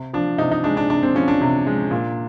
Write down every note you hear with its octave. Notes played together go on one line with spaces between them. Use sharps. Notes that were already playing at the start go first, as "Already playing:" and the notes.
Already playing: C3
F3 D4
C3 D#4
D#4
G#3 D4
D4
C3 D4
C4
F3 C#4
D4
C3
G#3
A#2